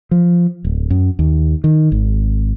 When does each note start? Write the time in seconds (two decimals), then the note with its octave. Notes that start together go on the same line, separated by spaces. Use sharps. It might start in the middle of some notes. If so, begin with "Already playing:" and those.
0.11 F3
0.64 D1
0.90 F#2
1.19 D#2
1.64 D#3
1.92 G#1